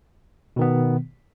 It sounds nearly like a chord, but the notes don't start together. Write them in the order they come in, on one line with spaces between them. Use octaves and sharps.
B2 D#3 B3